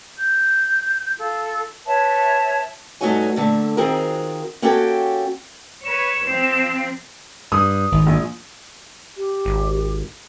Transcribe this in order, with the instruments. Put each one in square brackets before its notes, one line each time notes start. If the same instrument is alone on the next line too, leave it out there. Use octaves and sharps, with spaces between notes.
[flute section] G6
F4 A4
B4 C#5 E5 A5
[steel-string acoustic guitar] G2 A3 D#4 F#4 C#5 G#5
A#2 D3 A3
D#3 F3 C4 F#4 G#4 A#4
A#3 C#4 F#4 G4 A4 G5
[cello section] B4 C#5 [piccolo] E7
[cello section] F3 C4
[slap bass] G2 [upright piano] D#6
[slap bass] G#1 D#2
[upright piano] A#1
[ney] G4
[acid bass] G#1